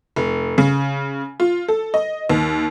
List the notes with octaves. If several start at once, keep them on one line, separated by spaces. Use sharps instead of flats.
F1
C#3
F4
A4
D#5
D#2